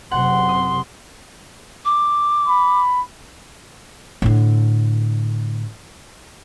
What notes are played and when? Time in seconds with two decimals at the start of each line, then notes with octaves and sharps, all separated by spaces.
0.11 F#1 C3 F#5 C6
0.49 D#6
1.85 D6
2.48 B5
4.22 A2 D3